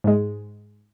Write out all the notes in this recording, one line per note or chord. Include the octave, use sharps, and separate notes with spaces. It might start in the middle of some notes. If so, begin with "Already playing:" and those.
G#2 G#3